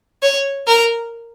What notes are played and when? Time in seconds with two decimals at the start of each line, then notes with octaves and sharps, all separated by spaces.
0.23 C#5
0.67 A#4